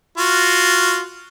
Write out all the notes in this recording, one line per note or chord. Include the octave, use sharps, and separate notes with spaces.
F4 F#4